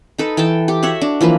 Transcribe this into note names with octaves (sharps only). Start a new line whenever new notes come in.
D#4 A4 B4
E3 A4 G5 A5
G4
F#4 C#5 E5 F#5
D4
E3 F3 A#3 B4